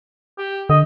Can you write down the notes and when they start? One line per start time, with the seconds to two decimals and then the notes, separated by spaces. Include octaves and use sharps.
0.38 G4
0.69 D3 D#5